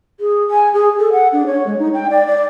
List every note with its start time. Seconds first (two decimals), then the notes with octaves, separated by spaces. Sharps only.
0.20 G#4
0.50 G#5
0.74 G#4
0.99 A4
1.12 F#5
1.33 D4
1.46 C#5
1.67 G#3
1.79 D#4
1.94 G5
2.10 D5
2.27 D5